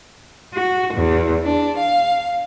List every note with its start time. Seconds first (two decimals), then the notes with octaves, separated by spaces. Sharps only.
0.55 F#4
0.94 E2
1.44 D4
1.78 F5